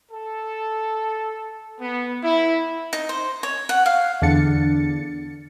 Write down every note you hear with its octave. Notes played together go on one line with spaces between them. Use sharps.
A4
B3
E4
D#4
C5
C#5
F#5
F5
E2 D3 D4 A6 C#7